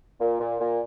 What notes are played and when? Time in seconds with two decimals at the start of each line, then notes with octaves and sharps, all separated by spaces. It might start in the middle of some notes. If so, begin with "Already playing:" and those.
0.21 A#2
0.40 A#2
0.60 A#2